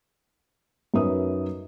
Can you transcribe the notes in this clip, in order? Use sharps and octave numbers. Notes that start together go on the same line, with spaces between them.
F#2 D#4 A#4 B4 E5 D#6